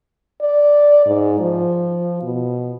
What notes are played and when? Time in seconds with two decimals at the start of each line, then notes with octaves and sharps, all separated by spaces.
0.41 D5
1.06 G#2
1.40 F3
2.22 B2